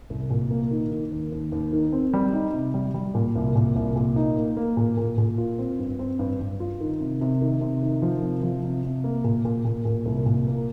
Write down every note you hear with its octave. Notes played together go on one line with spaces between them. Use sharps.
C2
A#2
A#3
D#3
D#3
D#2
D#2
D#2
D#3
C4
G3
D#4
C3
G3
G3
A#2
C2
A#2
C2
A#2
D#4
A#3
A#3
A#2
A#2
A#2
F4
C4
G2
C4
G2
G2
F4
D#3
C3
C3
D#3
C3
D#3
F3
C3
F3
C3
C3
A#3
A#2
A#2
A#2
A#2
C2
A#2
A#3